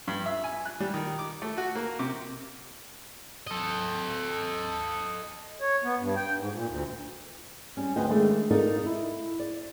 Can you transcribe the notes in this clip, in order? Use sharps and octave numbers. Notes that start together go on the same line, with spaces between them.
G2
E5
G#5
F#6
G3
D#3
D6
A3
F#4
A#3
C3
A4 D#5
C#5
B3
G2
G5
G#2
A#2
D2
G3 C#4
D2 B3 F4 D#5 G5
D#3 G#3 A3 D4
D#4 F4 A4 A#4 D5 D#5
E4
D5